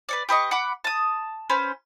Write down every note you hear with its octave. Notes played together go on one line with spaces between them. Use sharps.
B4 C#5 D5
G4 B4 D#5 C#6
F#5 B5 D6
A5 D#6
C#4 B4 C5